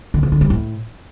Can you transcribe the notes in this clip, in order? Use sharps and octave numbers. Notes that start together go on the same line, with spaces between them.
D3
C#3
D3
G3
A2